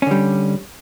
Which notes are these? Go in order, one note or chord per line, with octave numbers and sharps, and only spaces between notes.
D3 G3 C#4